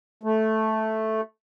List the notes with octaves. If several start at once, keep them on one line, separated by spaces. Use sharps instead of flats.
A3